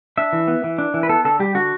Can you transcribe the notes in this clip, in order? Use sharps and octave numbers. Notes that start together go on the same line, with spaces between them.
D4 E5
E3
B3
E3
D4
E3
B4
B3 A4
D3 A4
G3 G4
D3 F#4